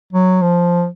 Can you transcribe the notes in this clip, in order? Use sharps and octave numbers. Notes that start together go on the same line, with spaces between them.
F#3
F3